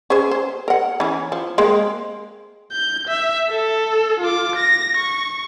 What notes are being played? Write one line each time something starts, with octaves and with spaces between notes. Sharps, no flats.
C#4 G#4 C5
C5
A#4 F#5
E3 C#4
F3
G#3 A#3 C4
G6
E5
A4
F4 D6
A#6
C#6